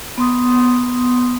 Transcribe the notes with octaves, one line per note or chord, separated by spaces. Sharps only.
B3 C6 D#6